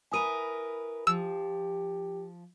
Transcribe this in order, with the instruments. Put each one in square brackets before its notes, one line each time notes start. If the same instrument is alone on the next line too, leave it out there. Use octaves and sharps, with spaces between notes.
[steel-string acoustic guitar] E4 A#4 B4 [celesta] G#5 D#6 D#7
[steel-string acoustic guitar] F3 [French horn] G4 [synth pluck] E6